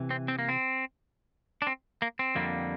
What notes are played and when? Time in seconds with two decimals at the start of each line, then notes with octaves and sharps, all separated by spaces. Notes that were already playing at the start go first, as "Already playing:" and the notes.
Already playing: C3 E3
0.11 C4
0.28 C4
0.39 A#3
0.49 C4
1.62 D4
1.67 C4
2.02 A#3
2.19 C4
2.35 F2 D3 G3 A#3